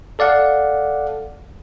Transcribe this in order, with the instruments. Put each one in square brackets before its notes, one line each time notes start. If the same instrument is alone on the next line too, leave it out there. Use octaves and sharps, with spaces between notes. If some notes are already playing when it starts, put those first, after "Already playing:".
[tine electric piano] A4 D5 F5 F#5